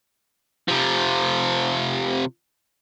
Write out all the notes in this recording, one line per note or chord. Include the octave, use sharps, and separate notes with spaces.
C3 F3